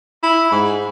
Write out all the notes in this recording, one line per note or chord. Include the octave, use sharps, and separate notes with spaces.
E4
G#2